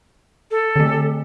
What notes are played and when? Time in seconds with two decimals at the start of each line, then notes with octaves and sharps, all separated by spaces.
0.51 A4
0.76 D3 A3